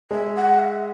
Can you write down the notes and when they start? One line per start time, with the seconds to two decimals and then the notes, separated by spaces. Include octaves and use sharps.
0.10 G#3 E5
0.35 F#5
0.59 E5